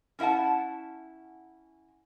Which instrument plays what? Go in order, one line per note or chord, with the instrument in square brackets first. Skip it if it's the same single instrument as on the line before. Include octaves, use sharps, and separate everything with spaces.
[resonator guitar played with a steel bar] C#4 E4 E5 F#5 A5